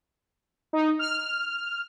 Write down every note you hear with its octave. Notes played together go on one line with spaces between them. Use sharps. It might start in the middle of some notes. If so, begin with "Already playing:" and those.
D#4
F6